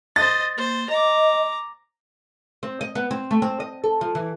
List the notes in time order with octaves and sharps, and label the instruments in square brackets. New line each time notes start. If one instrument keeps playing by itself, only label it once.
[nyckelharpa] C5 D#5 [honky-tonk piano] A6
[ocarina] A#3 [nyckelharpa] C5
[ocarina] D#5 [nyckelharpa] A#5 D6
[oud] C4
D#5
B3
C4
A3
C4
D#5
A4
F3
E3